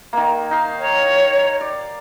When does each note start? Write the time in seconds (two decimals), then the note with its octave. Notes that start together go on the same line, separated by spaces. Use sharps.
0.13 D#3 A#3
0.51 D#4 F5
0.80 C#5
1.61 D5